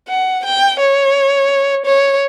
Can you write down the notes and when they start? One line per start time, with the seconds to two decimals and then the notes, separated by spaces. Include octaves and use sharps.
0.09 F#5
0.45 G5
0.80 C#5
1.86 C#5